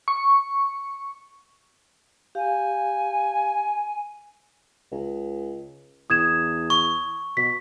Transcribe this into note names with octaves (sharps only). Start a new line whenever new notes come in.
C#6
G4 F5 G#5
C#2
E2 D#6 G#6 E7
C#6
B2 B6